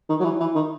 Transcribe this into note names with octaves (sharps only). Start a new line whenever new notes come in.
D#3
F#3
E3
E3
D#3